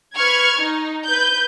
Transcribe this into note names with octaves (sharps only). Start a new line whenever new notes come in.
B4 C#6 F6 G#6
D#4
B4 G6